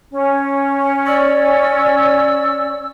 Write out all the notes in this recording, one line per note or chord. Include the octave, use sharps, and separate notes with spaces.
C#4
D5 E6